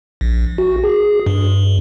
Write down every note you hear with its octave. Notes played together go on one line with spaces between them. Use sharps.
A#1
F#4
G#4
G2